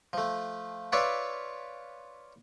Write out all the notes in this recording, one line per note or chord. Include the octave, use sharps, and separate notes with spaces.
F3 A3
F4 B4 C#5 D5 E5